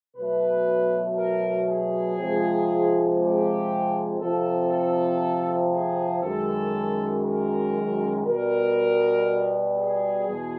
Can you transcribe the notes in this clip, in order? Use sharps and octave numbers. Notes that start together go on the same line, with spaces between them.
B2 F#3 A3 B4
A#4
G#4
C3 F3 G#3
G4
C3 F3 A3 A4
A4
G#4
F#2 D#3 G#3 A4
A#4
B2 G3 A#4
G#4
E2 B2